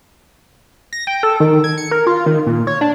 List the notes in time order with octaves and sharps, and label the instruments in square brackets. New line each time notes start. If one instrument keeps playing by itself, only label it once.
[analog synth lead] A#6
G5
A4
D#3
G#6
C#7
A#4
F4
D#3
A#2
C#5
D4